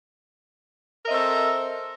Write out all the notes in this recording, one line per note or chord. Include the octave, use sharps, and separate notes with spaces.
C4 A4 A#4 D#5 E5